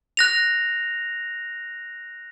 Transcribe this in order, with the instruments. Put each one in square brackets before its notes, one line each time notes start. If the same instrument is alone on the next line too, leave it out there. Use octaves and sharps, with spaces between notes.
[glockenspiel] F#6 A#6 F7